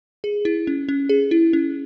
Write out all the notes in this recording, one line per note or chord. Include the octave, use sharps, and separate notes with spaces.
G#4
E4
C#4
C#4
G#4
E4
C#4